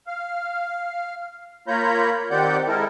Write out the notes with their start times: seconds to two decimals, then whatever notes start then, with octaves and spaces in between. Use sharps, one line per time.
0.07 F5
1.68 A#3 F4 C#5 A#5 B5 G6
2.31 D#3 C4 G4 D5 F#5 G6
2.68 G#3 E4 A4 A#4